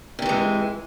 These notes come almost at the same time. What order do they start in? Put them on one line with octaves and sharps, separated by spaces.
C3 D#3 E3 G#3